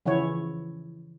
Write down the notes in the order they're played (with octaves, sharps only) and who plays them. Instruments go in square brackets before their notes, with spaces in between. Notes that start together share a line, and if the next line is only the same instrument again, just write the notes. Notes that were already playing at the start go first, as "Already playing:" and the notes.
[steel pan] C#3 E3 F3 E4 C#5